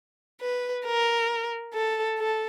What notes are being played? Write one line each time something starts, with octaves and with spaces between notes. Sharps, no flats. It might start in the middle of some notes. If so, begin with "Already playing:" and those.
B4
A#4
A4
A4